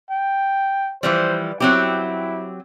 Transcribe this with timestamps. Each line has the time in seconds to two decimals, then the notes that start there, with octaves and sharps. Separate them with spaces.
0.10 G5
1.03 E3 F3 G3 C5
1.60 F#3 C4 E4 G4